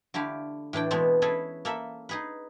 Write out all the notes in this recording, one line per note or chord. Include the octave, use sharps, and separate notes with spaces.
D3 A3 E4 G4 F5
A2 E3 D4 G5
B2 E3 G#3 A3 B3 C4
C#4 E4 G#4 A4 B4
A#3 A4 E5 B5
D#4 G#4 B4